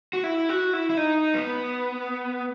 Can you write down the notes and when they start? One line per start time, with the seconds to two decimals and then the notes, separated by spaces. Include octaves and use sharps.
0.13 F#4
0.24 E4
0.49 F#4
0.73 E4
0.90 E4
0.97 D#4
1.34 B3